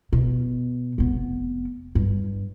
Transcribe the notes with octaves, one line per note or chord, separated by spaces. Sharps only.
B2
F1 B3
G2